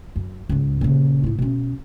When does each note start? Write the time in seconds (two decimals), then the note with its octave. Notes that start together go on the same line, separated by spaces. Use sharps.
0.16 F#2
0.49 C#2 G#2
0.81 A#2 C#3
1.24 A2 E4
1.39 B2 C#4